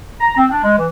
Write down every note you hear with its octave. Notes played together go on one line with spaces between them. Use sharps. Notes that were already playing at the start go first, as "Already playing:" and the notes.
A#5
C4
D4
G#3
E3